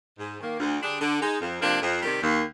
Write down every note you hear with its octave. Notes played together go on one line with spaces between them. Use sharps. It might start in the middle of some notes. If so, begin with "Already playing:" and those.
G#2
D#3 A#3
D2
D3 G3 D4 G#4
D3
G#3 D#4
F2
C3 F3 A#3 D4
F2
C3 D#3 G3
D#2